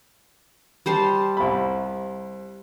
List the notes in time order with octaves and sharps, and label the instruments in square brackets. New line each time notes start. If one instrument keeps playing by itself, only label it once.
[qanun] G3 C5 A5
[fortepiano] C2 B5